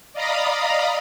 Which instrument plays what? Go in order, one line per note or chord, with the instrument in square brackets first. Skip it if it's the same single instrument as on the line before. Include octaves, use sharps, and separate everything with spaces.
[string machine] D5 D#5 F5 A#5 B5 D#6